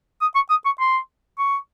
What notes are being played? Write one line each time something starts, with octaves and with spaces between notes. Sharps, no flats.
D#6
C#6
D#6
C#6
C6
C#6